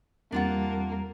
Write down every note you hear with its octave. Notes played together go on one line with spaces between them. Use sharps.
E2 G3 A#3 C4 D4 F4 F#5